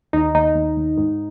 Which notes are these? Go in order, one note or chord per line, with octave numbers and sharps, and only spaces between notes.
D#2 D#4
D#2 D#4
D#2
D#2
G#2